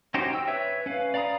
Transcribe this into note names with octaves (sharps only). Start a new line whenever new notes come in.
C#4 D#4 F#4 G4 C5
G5 E6
B4 C#5 E5 E6
C#4 B4 F5
D5 F5 A#5 B5 D#6